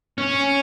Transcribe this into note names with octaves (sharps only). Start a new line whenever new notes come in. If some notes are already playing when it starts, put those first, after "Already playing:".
C#4